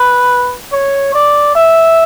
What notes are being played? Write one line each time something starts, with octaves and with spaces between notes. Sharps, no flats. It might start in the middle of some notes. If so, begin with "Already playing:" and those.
Already playing: B4
C#5
D5
E5